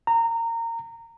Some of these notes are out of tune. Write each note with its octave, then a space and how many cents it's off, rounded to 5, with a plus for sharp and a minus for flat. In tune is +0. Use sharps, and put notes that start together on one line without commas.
A#5 -20